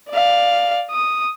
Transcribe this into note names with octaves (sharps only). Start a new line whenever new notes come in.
D5 F5
D#6